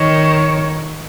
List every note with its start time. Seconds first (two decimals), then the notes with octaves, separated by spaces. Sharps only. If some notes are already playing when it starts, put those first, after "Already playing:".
Already playing: D#3 C#5